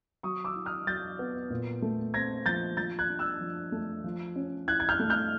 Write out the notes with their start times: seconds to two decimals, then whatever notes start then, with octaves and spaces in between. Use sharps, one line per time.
0.23 F#3 C#6 D#6
0.45 D6 E6
0.56 E4
0.66 D#6 F6
0.87 F#3 G6 A6
1.19 B3
1.50 A#2
1.82 A3
2.14 C4 G#6 A#6
2.46 F3 G6 A6
2.77 F3 G6 A6
2.99 F#6 G#6
3.09 D4
3.19 E6 F#6
3.41 F3
3.72 A3
4.04 F3
4.36 C#4
4.68 E4 F#6 G#6
4.80 G#6
4.89 F6 G6
4.99 A3
5.10 F6 G6